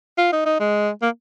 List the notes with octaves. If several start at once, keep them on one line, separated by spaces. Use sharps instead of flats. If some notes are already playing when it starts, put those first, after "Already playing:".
F4
D#4
D#4
G#3
A#3